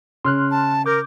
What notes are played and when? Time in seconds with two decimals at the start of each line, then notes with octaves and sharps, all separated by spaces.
0.25 C#3 C6 F6 F#6
0.51 A5
0.86 A#4 D6 G6